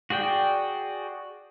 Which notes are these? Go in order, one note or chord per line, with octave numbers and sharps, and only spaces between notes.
F#4 G#4 D5 G5